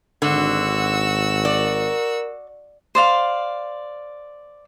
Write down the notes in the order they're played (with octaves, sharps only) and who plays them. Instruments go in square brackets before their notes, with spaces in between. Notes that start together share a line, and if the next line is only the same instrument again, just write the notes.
[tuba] G#1 [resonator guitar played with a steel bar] D3 [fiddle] F#4 E6
[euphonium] A#4 [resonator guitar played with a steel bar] D5
[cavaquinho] C5 D5 F5